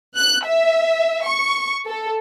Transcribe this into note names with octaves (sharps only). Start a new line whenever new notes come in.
F#6
E5
C#6
A4